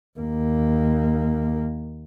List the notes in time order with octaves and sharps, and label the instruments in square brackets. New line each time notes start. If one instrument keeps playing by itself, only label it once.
[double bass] D#2 A#3